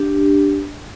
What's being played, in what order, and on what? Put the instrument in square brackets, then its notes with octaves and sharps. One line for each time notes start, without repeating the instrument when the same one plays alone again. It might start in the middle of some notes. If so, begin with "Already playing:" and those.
Already playing: [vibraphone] D4 G4